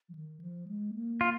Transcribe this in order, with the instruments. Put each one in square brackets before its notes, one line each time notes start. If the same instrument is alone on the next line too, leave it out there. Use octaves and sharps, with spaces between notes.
[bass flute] F3
D#3
F3
G#3
A#3
[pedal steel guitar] F4